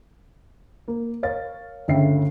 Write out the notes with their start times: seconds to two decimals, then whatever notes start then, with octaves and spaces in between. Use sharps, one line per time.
0.88 A#3
1.23 A#4 C#5 F5 A6
1.88 G1 D2 C#3 E5 G5 C7